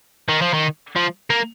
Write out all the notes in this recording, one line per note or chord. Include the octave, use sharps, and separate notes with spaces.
D#3
F3
D#3
F3
A#3